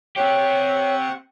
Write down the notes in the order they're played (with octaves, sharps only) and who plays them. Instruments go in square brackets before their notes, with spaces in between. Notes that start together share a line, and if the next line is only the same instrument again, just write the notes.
[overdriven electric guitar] C4 G4 [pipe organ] C5 F#5 C#6 [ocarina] C#5